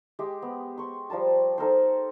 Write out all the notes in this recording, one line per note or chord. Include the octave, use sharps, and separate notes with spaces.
G#3 G4
B3
C6 C#6
F3 G3 A#4 A5
D#4 A4 A#4 C5